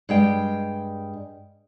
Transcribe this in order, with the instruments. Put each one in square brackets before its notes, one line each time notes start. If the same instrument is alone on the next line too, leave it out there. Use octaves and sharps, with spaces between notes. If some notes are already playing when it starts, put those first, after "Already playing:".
[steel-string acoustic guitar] G2 G#3 G5